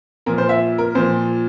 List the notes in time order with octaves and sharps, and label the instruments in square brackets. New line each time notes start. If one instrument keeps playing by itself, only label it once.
[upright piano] A#2 F3 A#4
C5
E5
A#4
A#2 F3 C5